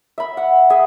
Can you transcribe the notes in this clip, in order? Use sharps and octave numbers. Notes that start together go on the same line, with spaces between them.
E5 B5
F#5
G#4 E5